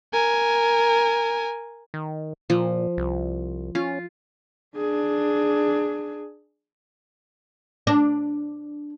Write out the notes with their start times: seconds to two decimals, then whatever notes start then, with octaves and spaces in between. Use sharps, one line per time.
0.13 A#4 G#5
1.94 D#3
2.50 A#2 F3
2.97 C2
3.75 C#4 F4
4.77 D4 G#4
7.87 D4